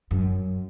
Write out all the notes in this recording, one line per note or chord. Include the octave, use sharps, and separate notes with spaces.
F#2